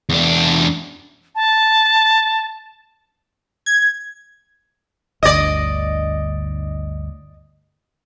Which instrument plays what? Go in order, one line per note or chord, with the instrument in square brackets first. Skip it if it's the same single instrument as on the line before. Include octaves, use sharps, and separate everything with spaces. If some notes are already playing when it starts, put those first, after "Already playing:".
[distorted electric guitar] E2 D4
[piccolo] A5
[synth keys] G#6
[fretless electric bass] G1 D2 [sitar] D5 D#5